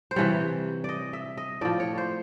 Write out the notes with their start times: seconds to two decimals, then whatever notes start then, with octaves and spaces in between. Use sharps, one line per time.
0.11 C5
0.16 C3 E3 G3 C#5
0.84 D5 D#5
1.13 E5
1.37 D#5
1.61 A2 F3 D5
1.80 C#5
1.98 C5